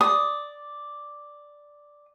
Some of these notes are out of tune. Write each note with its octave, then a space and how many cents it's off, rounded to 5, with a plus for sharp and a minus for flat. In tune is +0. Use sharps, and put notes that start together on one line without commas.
D5 +0 D#6 +0